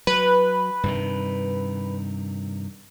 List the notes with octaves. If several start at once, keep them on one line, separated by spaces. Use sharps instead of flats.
F#3 B4
G2 C3 D#3